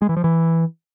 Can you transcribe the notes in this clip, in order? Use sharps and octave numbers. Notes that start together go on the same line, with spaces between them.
G#3
E3
F3
E3